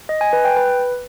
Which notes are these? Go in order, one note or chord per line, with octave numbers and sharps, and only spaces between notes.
D#5
G#5
B4
G5
B4